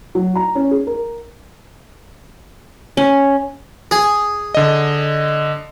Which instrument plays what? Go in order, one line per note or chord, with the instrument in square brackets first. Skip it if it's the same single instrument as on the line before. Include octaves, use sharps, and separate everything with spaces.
[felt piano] F#3
A#5
C#4
G#4
A#4
[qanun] C#4
[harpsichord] G#4
[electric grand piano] D3 D#5